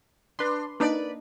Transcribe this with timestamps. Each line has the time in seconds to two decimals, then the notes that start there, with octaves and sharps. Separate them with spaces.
0.39 D4 B4 C6
0.80 A#3 D4 D#4 B4 D5